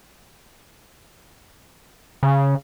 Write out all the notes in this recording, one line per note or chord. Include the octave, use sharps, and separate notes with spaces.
C#3